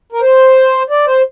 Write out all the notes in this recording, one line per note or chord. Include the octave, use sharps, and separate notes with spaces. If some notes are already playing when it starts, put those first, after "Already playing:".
A#4
C5
D5
C5